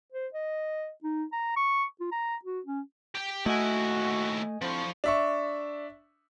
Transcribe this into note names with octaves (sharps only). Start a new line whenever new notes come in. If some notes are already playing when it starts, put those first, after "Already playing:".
C5
D#5
D#4
A#5
C#6
F4
A#5
F#4
C#4
G4 G5
D#2 A3 E4 F#4 D#5 G#5
D2 F3 C4 E4 C5 C#6
D4 E5 C#6